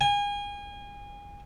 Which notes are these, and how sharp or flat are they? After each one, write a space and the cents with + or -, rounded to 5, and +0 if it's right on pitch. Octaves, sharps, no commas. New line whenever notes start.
G#5 -30